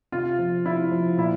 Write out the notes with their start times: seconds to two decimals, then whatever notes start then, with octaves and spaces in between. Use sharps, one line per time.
0.12 C3 F4
0.39 F3
0.65 C3 E4
0.91 F3
1.17 A#2 E4